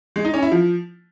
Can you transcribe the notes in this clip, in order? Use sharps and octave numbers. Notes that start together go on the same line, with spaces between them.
G#3
D#4
C#4
E4
F3